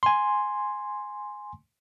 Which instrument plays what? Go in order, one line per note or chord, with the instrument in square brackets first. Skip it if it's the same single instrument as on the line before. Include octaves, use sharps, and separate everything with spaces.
[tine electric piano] G#5 C6